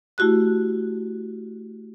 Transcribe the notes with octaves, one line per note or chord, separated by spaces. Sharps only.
A3 E4 F#4 G4 F#6